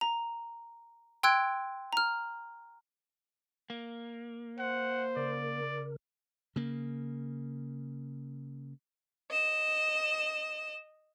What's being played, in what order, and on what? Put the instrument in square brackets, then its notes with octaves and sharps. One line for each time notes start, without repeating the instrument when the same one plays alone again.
[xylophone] A#5
G5 C6 E6 F#6 G#6 D7
A#5 F6
[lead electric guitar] A#3
[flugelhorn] C5 [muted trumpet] F#5
[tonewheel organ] C#3 A#4 [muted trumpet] D5
[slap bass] C#3 A#3
[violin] D#5 E7